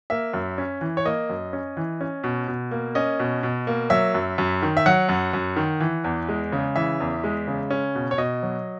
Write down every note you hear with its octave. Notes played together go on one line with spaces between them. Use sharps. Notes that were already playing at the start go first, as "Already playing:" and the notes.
A#3 E5
F#2
C#4
E3
C#5
A#3 D#5
F#2
C#4
E3
C#4
B2
B2
A#3
C#4 D#5
B2
B2
A#3
F#3 E5
F#2
F#2
D#3
E5
F#3 F#5
F#2
F#2
D#3
E3
E2
G#3
C#3
E3 E5
E2
G#3
C#3
C#4
B2
C#5
B2 D#5
F#3